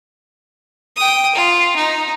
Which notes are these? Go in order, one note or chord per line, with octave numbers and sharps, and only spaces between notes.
G5 D#6
F4
D#4